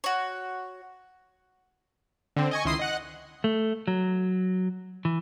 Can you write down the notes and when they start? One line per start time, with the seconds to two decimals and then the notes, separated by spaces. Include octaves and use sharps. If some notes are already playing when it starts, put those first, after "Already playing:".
0.04 F#4 C#5
2.37 D3 C4
2.51 D#5 G#5 C#6
2.65 C#2 D#3 E4 C6 D#6 C7
2.79 D#5 F#5 F#6
3.44 A3
3.88 F#3
5.05 E3